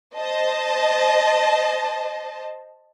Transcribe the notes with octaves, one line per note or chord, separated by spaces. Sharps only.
C5 D#5 A5